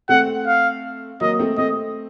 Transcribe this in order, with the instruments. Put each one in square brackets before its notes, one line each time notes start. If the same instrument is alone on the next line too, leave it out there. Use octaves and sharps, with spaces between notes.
[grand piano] A3 C4 [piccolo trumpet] F#5
[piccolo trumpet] F5
[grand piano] F#3 A#3 [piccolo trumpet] D#5
[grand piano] A3 C4
[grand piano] A3 C4 [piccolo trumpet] D#5